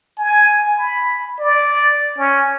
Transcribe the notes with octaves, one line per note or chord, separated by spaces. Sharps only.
G#5
B5
D5
C#4